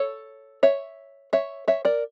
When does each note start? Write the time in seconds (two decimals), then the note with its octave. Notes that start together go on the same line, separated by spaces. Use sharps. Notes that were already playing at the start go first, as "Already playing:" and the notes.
Already playing: A4 C#5
0.63 C#5 E5
1.33 C#5 E5
1.68 C#5 E5
1.85 A#4 D5